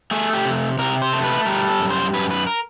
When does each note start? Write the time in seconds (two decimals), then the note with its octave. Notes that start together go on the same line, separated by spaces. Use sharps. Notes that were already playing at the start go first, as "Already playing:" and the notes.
0.11 A3 G#4
0.33 G4
0.45 C3
0.79 C3 A#4
1.02 C5
1.13 A3
1.24 B4
1.46 G3 A#4
1.69 A4
1.79 F#2
1.90 C5
2.13 F#2 B4
2.31 B4
2.47 A#4